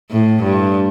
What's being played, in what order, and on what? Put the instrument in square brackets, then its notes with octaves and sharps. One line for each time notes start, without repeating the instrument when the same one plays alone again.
[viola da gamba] A2
G2